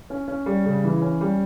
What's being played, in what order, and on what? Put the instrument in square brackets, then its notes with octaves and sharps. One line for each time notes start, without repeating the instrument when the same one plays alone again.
[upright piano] C#4
C#4
G3
C#3
E3
C#4
G3